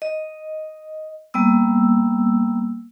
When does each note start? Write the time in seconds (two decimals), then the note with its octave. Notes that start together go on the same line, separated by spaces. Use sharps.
0.02 D#5
1.34 G3 A#3 B3 E6